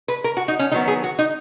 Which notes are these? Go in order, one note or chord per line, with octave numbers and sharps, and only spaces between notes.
B4
A#4
F#4
D#4
C#4
D#3 F#3 B3 D#4
G#4
F#4
D#4